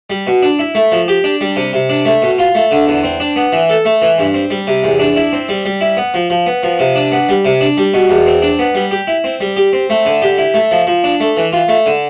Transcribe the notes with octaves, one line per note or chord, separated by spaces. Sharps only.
G3
B2
D4
E4
A3
F3
G4
D4
G3
C3
C3
D4
A3
B2
F4
A3
D3
E2
C4
D4
B3
E3
A4
A3
E3
G2
C4
G3
C3
E2
D4
E4
C4
G3
G3
E4
B3
F3
F3
B3
F3
C3
D4
B3
G3
C3
D4
G3
B2
E2
C4
D4
B3
G3
G4
E4
C4
G3
G4
C4
A3
D3
G4
E4
A3
F3
F3
D4
A3
E3
F4
A3
D3